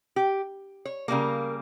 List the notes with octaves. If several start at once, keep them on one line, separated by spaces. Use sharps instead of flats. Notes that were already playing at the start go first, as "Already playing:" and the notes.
G4
C#5
C#3 G3 A#3 A#4